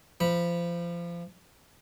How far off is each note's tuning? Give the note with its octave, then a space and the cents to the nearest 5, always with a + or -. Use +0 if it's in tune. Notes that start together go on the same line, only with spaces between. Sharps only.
F3 -25 B5 -10